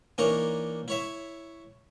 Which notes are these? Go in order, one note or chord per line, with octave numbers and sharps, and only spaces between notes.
E3 A#3 D4 D#4 A#4 C#5
E4 C#5 E5